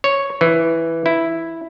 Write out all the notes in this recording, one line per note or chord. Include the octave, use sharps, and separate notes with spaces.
C#5
E3
E4